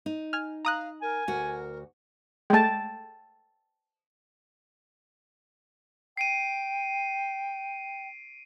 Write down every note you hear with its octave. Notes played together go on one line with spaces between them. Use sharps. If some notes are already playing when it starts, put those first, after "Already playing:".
D#4
G#5 F6
F5 A#5 D#6 F#6
A#4 G#5
D2 F#4 A#4
G#3 A3 G5 A5
G5 C7 D7 D#7